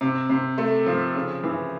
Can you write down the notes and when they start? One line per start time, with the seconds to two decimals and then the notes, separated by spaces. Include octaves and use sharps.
0.01 C3
0.30 C3
0.58 A3
0.86 F3
1.15 C#3
1.44 E3